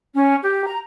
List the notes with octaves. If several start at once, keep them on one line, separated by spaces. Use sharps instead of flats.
C#4
G4
A#5